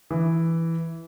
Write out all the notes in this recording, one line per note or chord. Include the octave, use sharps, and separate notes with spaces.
E3